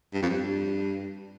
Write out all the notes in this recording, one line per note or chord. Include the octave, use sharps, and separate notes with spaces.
G2
F2
G2